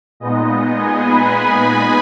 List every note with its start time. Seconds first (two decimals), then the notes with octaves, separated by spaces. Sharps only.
0.20 A#2 G#3 B3 D#4 D#5
0.76 G#4 G#5
1.05 B4 B5